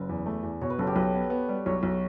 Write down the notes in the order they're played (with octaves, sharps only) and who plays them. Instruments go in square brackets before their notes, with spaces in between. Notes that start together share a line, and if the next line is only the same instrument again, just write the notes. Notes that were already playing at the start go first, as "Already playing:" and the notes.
Already playing: [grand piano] F#1 [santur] B4
[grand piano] E2
A3
E2
[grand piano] B2 [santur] C#5
[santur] B4
[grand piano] F#1 [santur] A4
[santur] G4
[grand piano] B1 [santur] B4
[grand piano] B3
B3
G3
[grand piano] B1 [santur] C#5
[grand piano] B1